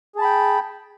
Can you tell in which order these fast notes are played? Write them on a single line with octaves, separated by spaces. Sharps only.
G#4 A5 B5 G5